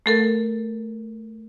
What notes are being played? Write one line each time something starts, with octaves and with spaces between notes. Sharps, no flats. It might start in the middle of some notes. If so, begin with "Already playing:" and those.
A3 A4 A#4